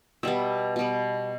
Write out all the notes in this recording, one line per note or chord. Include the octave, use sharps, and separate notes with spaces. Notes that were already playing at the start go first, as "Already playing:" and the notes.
B2 G3 B3 E5
B2 G3 B3